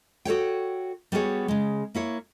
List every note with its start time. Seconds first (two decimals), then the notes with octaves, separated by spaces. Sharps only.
0.25 F#4 A4 C#5 G5
1.12 G3 B3 F#4 G#4 C#5
1.48 C#3 G#3
1.94 A#3 E4 C#5